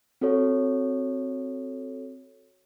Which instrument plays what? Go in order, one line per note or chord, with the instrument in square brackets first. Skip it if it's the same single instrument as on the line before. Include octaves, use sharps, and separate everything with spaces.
[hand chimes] C4 F#4 A4 C#5